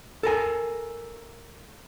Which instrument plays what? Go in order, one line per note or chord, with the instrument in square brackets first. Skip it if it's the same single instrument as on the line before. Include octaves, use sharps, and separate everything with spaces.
[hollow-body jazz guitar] A4 A#4 G#5